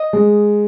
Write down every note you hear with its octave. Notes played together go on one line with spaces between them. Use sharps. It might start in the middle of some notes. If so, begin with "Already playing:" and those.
Already playing: D#5
G#3